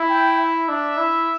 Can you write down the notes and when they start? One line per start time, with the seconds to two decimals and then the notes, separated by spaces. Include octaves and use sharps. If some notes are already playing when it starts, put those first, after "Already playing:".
Already playing: E4
0.09 G5
0.38 E5
0.69 D4
0.98 E4